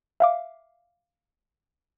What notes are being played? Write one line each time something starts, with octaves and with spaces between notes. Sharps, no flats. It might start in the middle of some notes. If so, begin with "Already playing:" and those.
E5 F5 D6